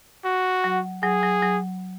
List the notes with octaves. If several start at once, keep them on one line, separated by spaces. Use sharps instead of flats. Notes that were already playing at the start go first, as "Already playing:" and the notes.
F#4
F#3
F#3 G#4
F#3
F#3